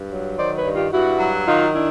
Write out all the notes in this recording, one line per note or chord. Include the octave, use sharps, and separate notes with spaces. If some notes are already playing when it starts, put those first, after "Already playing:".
Already playing: G2
F#3
D#3 C5 D5
B4 C#5
G2
F4 G4
G2 E4 F#4
F#3
D#3 D#4 F4
D4 E4